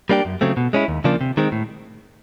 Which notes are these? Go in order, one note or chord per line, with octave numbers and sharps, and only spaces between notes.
G3 A#3 D4 G4
F#2
C#3 F#3 A3 C4
B2
G#3 C#4 E4
D#2
C#3 F3 A#3 D4
C3
D#3 G#3 C4
A2